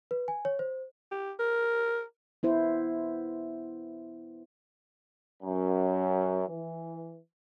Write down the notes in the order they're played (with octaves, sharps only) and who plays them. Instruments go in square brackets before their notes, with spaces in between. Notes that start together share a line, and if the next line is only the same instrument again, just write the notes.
[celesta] B4
G#5
C#5
C5
[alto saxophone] G4
A#4
[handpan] B3 E4 C5
[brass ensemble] F#2
E3